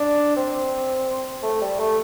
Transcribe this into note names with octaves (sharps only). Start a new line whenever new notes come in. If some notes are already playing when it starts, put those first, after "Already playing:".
Already playing: D4
C4
A3
G3
A3